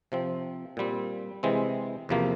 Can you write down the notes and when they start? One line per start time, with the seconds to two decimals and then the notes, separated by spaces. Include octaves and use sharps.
0.12 C3 F3 C4
0.77 A#2 G3 C4
1.43 C3 E3 G#3 C4
2.09 E2 C3 F3 A#3